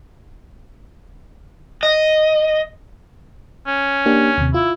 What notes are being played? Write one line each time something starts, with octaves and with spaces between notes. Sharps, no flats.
D#5
C#4
A#3 D4 G4
D#2 C3
E4 F4